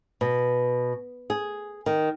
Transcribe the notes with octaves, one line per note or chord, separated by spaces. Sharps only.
B2
G#4
D#3